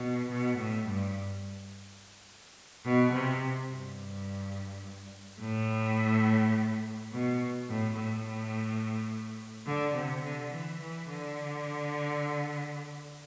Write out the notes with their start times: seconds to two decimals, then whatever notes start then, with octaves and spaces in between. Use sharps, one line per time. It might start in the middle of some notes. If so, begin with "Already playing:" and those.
Already playing: B2
0.30 B2
0.57 A2
0.86 G2
2.85 B2
3.13 C3
3.70 G2
5.40 A2
7.12 B2
7.69 A2
7.97 A2
9.67 D3
9.96 C3
10.24 D3
10.52 E3
10.81 E3
11.10 D3